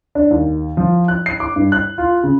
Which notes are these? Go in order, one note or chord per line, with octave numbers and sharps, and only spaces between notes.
D4
D#2
F3
F#6
C7
D6
G2
F#6
F4
C#3